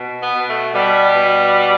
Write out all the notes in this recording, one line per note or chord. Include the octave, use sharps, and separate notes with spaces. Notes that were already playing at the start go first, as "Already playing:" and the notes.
Already playing: B2
B3
B2
A3
B2 G3
B2